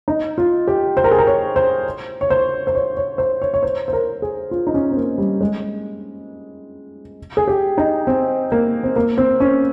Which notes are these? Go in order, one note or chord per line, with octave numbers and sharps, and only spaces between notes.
D#4
F4
G4
C5
A#4
G#4
A#4
C#5
C5
C#5
C5
C5
C#5
C#5
C5
C#5
C#5
C5
C5
A#4
G#4
F4
D#4
C#4
C4
A#3
G3
G#3
G#4
G4
D#4
C4
A#3
C4
A#3
C4
C#4